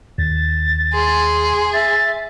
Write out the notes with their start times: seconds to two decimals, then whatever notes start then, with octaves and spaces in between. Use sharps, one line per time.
0.18 D#2 A6
0.93 G#4 C6
1.73 E5 A6